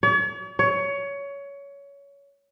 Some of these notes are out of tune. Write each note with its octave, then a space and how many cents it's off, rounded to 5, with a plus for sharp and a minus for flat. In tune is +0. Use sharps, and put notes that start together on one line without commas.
C#5 +45
C#5 +20